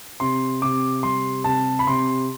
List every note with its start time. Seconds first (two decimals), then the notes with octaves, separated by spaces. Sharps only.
0.20 C3 C6
0.62 C3 D6
1.03 G3 C6
1.44 C3 A5
1.79 B5
1.87 C3 C6